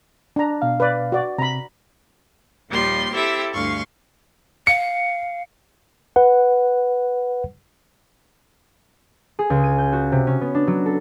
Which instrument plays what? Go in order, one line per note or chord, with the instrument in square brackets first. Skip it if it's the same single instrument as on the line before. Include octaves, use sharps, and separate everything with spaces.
[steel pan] D4 A#5
[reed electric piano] B2 F5
[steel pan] B4 D5
F#4 D5
[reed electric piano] C3 [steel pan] A#5 B5
[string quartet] D#2 A#2 F3 G3 C6
C4 E4 G4 A4 E5
D2 G2 F5 C6 C#6
[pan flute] F5 [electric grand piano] C#7
[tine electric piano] B4 F#5
[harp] G#4
C#2
D#7
G6
F#4
C3
C#4
B3
D4
F#3
A4